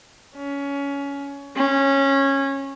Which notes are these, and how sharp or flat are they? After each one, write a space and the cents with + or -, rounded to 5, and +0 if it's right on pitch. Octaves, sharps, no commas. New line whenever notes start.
C#4 +20
C#4 -15